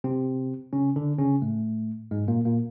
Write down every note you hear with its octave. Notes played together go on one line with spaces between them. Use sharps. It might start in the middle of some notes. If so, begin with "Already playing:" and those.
C3 C4
C#3 C#4
D3 D4
C#3 C#4
A2 A3
G#2 G#3
A#2 A#3
A#2 A#3